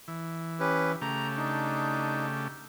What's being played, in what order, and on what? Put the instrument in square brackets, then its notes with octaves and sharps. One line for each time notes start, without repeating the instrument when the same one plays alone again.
[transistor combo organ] E3
[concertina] C#4 G4 B4
[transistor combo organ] C#3 A3 G4 [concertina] A#5
[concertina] D4 D#4